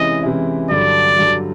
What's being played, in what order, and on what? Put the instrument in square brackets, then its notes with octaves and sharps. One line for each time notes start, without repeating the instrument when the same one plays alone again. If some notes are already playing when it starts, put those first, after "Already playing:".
Already playing: [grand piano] C3 E3 G#3 C#4 E4 [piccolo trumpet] D#5
[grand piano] C3 E3 G#3 C#4 E4
[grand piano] G2 D3 F#3 [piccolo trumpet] D5
[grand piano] G2 D3 F#3